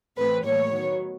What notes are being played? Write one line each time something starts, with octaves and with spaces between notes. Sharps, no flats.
A2 E3 A3 C4 B4
A2 E3 G3 A#3 C#5
D#3 F#3 B3